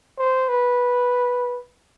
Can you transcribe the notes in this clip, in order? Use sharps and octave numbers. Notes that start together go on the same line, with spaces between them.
C5
B4